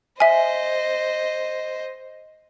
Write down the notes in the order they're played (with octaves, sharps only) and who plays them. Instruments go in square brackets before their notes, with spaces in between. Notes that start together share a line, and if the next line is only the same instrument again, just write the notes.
[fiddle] C5 D#5 [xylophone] E5 G#5